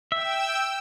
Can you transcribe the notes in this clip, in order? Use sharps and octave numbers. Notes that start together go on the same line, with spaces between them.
E5 G5 E6